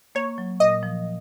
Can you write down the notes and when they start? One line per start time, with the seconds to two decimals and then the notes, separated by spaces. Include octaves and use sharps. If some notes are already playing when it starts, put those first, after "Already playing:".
0.15 A#3 C#5
0.38 F#3
0.60 A#2 D#5
0.83 F3